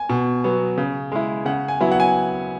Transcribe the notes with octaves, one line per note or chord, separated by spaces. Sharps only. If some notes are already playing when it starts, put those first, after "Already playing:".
Already playing: G#5
B2
F#3 B3
C#3
G#3 E4
C#3 F#5
G#5
F#3 B3 E4
F#5
G#5